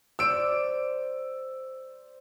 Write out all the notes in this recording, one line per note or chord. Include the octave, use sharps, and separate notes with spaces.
C5 D5 E6 D7